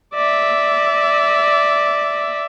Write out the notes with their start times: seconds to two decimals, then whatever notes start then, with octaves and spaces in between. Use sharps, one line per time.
0.14 D5 E5